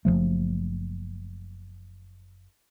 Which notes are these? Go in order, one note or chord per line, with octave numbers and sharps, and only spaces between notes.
F#1 F#2 F3 A3